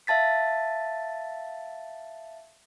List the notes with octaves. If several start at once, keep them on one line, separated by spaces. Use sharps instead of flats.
E5 F5 A5 A6 B6